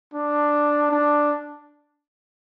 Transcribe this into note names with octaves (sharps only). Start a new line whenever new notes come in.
D4
D4